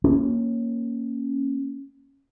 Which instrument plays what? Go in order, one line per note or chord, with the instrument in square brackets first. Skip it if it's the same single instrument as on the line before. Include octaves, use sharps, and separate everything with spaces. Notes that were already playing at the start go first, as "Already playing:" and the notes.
[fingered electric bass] A#3 C#4